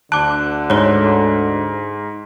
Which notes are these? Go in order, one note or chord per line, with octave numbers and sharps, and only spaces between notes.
D2 D3 A5 D6 F#6
G#2 C#5 G7